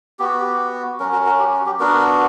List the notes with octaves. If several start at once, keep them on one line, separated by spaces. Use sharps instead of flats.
B3 F#4 G4
G4
F#3 C#4 F#4 A#4
F#4 A#4
F#4 A#4
G4
F#4
G4
B3 D4 F#4 A#4